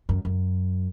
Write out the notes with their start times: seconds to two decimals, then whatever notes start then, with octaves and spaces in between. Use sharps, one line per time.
0.09 F#2
0.25 F#2